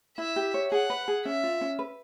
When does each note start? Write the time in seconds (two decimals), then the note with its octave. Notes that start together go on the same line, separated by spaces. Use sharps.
0.18 E4 E5
0.36 G4
0.54 C#5
0.71 G#4 F#5
0.90 B4
1.08 G#4
1.25 C#4 E5
1.43 F4
1.61 C#4
1.79 B4